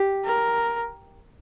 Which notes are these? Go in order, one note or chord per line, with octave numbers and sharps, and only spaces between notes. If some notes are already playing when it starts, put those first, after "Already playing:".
Already playing: G4
A#4